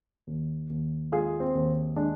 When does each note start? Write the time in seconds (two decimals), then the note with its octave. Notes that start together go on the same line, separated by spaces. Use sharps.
0.27 D#2
0.70 D#2
1.12 G#3 F4 G#4
1.40 C4
1.55 D#2
1.96 G#3 D4